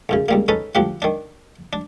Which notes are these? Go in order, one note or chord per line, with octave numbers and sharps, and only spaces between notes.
B1 F#2 C#3
C#2 G3 A#3
C#4 D#4 A4 B4
D2 F3 G4 F#5
D#3 D4
D4